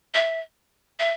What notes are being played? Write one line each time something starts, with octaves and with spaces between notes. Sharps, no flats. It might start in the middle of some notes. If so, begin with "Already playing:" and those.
E5
E5